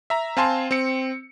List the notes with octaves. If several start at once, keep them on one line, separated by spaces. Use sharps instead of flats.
E5 A#5
C4 F5 G#5 A5 C6
C4 C#7